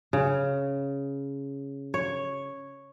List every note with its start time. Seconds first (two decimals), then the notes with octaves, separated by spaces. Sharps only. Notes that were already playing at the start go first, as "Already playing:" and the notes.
0.13 C#3
1.94 C#5